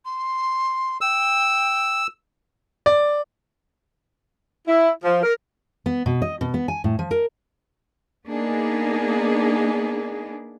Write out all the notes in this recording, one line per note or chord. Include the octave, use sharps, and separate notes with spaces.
C6
G5 E6
D5
E4
F3
A#4
B3
B2
D#5
B2
B3
G#5
A2
F3
A#4
A#3 B3 D4 D#4 G#4